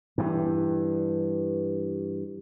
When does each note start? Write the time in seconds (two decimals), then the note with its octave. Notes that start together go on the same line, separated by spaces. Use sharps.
0.18 G2 E3